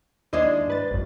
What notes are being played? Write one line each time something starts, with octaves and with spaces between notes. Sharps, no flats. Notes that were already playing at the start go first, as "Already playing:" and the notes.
D#2 G#3 D4 E4 C5 D#5
G2 B4 A6
G#1 F#2